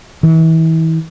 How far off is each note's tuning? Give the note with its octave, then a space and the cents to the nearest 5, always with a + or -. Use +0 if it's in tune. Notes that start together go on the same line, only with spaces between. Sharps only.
E3 -35